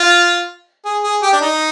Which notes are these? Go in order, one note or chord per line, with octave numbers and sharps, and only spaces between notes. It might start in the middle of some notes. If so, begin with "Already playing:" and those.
Already playing: F4
G#4
G#4
G4
D4
D#4